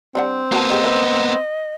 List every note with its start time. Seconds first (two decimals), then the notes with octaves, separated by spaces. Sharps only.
0.15 G3 C4 D4 F#5
0.52 A#3 B3 F#4 G5 A5
0.70 G#3 G4 D#5
0.84 B4 E5